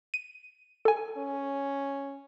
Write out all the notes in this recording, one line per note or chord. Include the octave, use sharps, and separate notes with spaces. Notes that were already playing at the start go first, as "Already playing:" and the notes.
D#7
A4 G#5
C#4